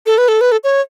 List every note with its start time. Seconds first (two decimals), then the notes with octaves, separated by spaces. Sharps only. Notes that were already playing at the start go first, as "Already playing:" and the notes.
0.06 A4
0.18 B4
0.28 A4
0.41 B4
0.52 A4
0.64 C#5